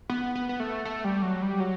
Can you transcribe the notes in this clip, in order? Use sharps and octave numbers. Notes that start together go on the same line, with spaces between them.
B3
B3
B3
A3
A3
G3
F#3
G3
F#3